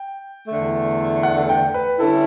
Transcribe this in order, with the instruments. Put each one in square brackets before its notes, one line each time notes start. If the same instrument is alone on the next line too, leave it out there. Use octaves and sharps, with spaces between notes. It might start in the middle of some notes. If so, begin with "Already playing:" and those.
Already playing: [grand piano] G5
[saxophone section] E2 D3 A3
[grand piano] F#5
G5
B4
[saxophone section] D3 G3 C#4 E4 [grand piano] A4